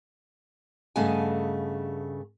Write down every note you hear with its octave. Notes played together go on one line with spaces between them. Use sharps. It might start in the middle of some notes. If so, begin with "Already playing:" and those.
G2 C#3 A3 B3 D#5 G#5